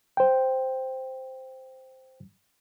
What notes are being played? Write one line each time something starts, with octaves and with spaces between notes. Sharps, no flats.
C5 G5